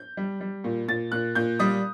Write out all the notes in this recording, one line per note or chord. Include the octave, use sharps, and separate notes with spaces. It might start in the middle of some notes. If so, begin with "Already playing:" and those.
Already playing: G6
G3
G3
A#2
A#2 A6
A#2 F#6
A#2 G6
G3 D#6